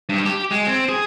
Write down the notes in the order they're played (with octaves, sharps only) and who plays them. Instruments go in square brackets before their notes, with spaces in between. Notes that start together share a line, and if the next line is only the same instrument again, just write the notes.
[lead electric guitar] G2
G4
G#3
C4
G#4